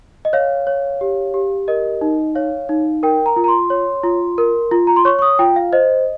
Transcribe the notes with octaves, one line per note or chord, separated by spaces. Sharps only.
D#5
C#5 F5
C#5
G4
G4
A#4 D#5
D#4
C#5 F5
D#4
A#4 G5
A#5
F4
A#5
C6
C#5
F4
A#4
F4
A#5
C6
C#5 C#6
C#6
D#6
F4 G5
F5
C5 D#5